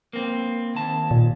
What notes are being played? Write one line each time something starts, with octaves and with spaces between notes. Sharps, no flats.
A#3 C4
D#2 A5
A#2